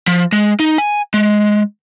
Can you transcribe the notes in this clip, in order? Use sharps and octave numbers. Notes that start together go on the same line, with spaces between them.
F3
G#3
D#4
G#5
G#3